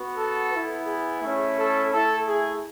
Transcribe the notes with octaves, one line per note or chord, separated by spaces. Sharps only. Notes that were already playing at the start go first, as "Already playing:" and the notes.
Already playing: B3 F#4
A4
B3 E4
G#4
A3 C#4 E4
A4
A3 E4 A4
G#4